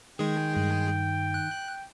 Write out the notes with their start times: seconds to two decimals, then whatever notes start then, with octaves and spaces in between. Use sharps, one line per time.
0.19 D#3 G#3 G#4 G5
0.56 G2
1.34 F#6